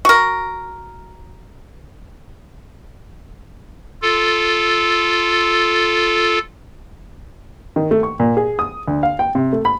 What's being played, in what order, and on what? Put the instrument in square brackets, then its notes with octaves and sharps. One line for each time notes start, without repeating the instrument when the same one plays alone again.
[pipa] F#4 A#4
[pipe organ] F4 A4
[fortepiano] D#3
A3
C#6
A#2
G#4
D#6
D2
F5
G5
C3
A3
B5